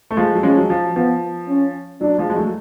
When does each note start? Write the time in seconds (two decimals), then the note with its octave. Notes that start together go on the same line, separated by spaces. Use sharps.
0.11 A3
0.17 F3 G#3
0.35 F#3
0.43 F3 G#3 C#4
0.58 F#3
0.70 F3
0.96 F3 B3
1.49 C#4
2.01 F#3 D4
2.18 F3 G#3
2.30 G#3
2.36 F#3 A3